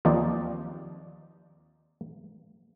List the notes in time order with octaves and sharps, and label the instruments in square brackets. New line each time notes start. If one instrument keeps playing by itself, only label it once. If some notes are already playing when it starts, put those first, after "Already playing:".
[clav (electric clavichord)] D#2 F3 C4 D#4 D5